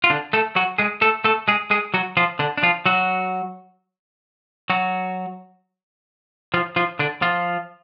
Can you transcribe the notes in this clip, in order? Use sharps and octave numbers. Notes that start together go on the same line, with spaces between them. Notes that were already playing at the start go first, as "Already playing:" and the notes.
F4
D3 D4
A3 A4
F#3 F#4
G#3 G#4
A3 A4
A3 A4
G#3 G#4
G#3 G#4
F#3 F#4
F3 F4
D3 D4
D4
F3 F4
F#3 F#4
F#3 F#4
F3 F4
F3 F4
D3 D4
F3 F4